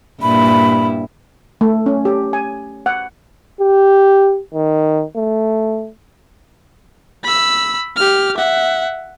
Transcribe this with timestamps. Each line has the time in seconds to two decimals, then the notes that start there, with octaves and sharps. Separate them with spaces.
0.22 G2 A#2 E4 B5
1.61 A3
1.86 C#4
2.05 G4
2.33 G#5
2.86 F#5
3.61 G4
4.54 D#3
5.16 A3
7.23 B5 E6
7.96 G4 F6
8.37 E5 F#5